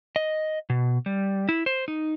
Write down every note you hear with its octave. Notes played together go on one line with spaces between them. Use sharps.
D#5
B2
G3
E4
C5
D#4